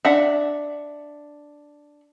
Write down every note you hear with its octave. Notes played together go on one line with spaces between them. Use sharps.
D4 E5 F#5